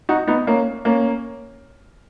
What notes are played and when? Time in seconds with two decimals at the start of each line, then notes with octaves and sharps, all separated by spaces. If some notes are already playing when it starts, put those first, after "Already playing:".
0.09 D#4 F#4
0.28 B3 D#4
0.47 A#3 C#4
0.85 A#3 C#4